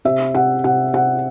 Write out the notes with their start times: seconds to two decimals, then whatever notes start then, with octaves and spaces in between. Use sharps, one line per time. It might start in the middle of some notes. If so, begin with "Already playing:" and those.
0.05 C3 E5
0.35 C3 F#5
0.64 C3 F#5
0.94 C3 F#5